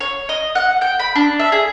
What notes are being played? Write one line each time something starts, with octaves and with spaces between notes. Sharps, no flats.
C#5
D#5
F#5
G5
B5
D4
E5
G#4